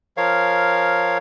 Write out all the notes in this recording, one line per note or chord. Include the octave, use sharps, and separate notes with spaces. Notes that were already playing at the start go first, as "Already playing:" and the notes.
F3 A#4 C#5 F5